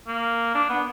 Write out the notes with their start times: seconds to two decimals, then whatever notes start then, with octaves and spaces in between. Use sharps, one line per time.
0.08 A#3
0.55 D4
0.69 B3